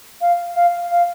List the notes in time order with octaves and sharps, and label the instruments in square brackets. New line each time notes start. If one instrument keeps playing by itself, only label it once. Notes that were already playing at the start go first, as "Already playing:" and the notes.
[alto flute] F5
F5
F5